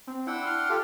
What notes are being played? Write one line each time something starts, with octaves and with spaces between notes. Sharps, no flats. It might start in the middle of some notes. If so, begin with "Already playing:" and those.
C4
D4 E4 F#5 G5 E6
C6 F6
F4 G4 A4